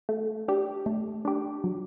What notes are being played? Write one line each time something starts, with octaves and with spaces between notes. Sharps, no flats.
A3
D4 G4
A3
D4 G4
F#3